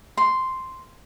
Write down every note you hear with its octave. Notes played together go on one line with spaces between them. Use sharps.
C6